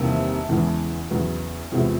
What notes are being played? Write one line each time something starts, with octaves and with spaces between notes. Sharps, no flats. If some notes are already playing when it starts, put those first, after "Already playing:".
Already playing: E2 C3 D#3 G3 A#3 A5
E2 C#3 E3 G#3 B3
E2 C#3 F#3 B3
E2 C3 F3 G#3 B3